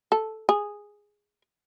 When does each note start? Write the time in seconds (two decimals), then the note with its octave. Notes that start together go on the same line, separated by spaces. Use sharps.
0.12 A4
0.49 G#4